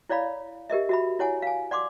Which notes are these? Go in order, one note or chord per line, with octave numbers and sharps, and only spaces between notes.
E4 C#5 D5 F5 B5
G4 A#4 D#5 E5
F#4 E5 B5
E4 C#5 F#5 G#5
F5 G#5
D5 F#5 C6 D6